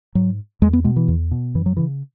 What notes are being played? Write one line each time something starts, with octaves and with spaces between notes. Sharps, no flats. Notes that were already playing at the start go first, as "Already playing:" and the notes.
G#2 F#3
E2 G#3
B3
B2 G#3
E3
E2
B2
F#2 E3
F#3
C#3 E3